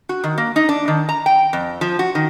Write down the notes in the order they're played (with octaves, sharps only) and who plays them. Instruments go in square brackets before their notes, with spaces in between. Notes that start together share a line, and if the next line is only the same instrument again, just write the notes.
[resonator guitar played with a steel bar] F#4
D#3
A#3
D#4
D4
D#3
A#5
G5
F2
F3
F#4
D#3